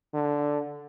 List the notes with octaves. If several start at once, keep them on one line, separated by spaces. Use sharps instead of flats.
D3